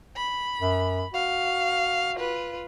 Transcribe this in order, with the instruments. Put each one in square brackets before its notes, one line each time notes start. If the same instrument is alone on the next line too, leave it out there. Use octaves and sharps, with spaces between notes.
[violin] B5
[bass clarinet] F#2
[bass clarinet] F#4 [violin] F5
[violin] F4 B4